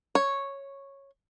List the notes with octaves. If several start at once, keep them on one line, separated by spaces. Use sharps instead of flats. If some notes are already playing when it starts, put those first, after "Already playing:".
C#5